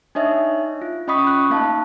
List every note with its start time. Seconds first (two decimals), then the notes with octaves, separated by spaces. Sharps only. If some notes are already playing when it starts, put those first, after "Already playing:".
0.15 D4 D#4 C#5 D#5 E5
0.82 F4
1.08 C#4 D#5 B5 C#6 D#6 B6
1.27 F#6
1.50 A#3 D#4 F5 A5